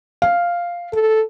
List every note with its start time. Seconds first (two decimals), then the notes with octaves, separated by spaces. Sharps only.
0.22 F5
0.93 A4